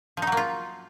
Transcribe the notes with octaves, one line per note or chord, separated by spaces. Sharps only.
F3 F#3 A#3 D#4 F4